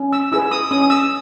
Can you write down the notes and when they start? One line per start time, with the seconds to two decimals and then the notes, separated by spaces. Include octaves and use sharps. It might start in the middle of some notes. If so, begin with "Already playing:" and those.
Already playing: C#4
0.13 E6
0.32 E4 G#4 B4 E6
0.51 D#6
0.71 C#4 D#6
0.82 D#6
0.90 E6